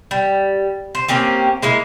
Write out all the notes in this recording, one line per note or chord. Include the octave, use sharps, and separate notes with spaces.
G3
C5
A#3 C4 C#4 G4
G#3 A#3 E4